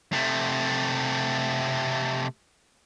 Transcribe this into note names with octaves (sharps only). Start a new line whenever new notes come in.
C3 A3